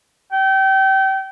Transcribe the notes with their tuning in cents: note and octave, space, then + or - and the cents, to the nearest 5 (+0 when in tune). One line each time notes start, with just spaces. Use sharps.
G5 -30